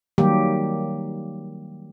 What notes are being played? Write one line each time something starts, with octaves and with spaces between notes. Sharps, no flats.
D#3 F#3 G3 A#3 G4